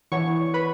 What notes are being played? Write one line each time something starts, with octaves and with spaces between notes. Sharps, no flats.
E3 B3 D4 C#5 C#6
B4 B5